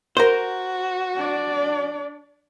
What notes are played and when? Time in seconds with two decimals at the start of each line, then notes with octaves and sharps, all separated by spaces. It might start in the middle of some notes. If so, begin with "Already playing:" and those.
0.17 F#4 A#4 C5
1.16 D4 D5